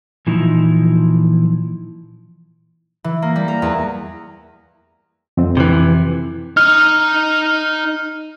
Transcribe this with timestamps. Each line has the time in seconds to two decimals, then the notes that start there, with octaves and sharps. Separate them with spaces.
0.27 A#2 E3 F3 D#4 E4
3.04 E3
3.22 A#3
3.36 G3
3.48 A#4
3.62 E2
5.37 F2 C4
5.57 C3 E3
6.57 D#4 D#5 F6